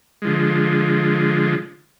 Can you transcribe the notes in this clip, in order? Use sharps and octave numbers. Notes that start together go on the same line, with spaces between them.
D3 F3 G#3